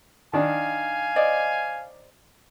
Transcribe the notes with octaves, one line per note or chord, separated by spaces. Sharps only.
D#3 D4 F5 G#5
C5 D5 D#5